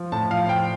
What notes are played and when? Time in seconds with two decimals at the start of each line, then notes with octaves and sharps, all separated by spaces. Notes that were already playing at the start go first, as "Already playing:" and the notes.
Already playing: F3
0.12 A2 A5
0.30 F3 F5
0.49 F3 G5